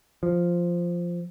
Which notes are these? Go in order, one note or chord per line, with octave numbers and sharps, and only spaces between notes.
F3